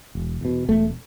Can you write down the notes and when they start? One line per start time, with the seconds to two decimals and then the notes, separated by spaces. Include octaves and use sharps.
0.15 E1
0.41 E2 B2
0.68 E1 A3